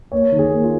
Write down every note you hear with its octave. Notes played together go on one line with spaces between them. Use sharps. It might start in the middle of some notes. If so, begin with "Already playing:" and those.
A#3 C#5
D#3
G#4
A#3
F4